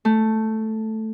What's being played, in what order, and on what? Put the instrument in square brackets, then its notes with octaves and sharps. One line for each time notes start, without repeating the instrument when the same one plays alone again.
[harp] A3